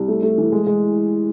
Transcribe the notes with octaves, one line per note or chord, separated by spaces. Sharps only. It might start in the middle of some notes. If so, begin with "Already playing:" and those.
Already playing: C2
A3
A3
E3
G#3
G#3